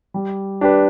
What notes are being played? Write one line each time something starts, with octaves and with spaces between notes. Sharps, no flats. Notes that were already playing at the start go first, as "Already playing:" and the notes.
G3
D4 G4 B4